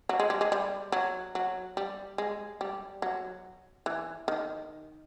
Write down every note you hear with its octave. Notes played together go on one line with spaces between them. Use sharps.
F#3
G#3
G3
G#3
G3
F#3
F#3
G3
G#3
G3
F#3
E3
D#3